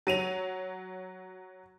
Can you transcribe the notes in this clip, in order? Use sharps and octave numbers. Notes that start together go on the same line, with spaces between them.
F#3 D#7 F7